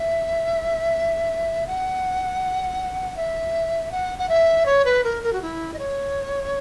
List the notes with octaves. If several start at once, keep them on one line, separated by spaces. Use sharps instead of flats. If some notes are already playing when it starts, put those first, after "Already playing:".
Already playing: E5
F#5
E5
F#5
F#5
E5
C#5
B4
A#4
A#4
F#4
E4
D#5
C#5